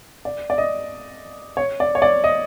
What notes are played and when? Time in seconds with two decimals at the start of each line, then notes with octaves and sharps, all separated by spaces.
0.25 D5
0.50 D5
0.58 D#5
1.57 C#5
1.80 D5
1.95 C#5
2.02 D5
2.24 D#5